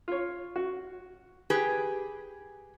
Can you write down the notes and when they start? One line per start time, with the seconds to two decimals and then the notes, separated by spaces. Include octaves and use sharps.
0.08 F4 C#5
0.56 F#4
1.50 G4 G#4 B4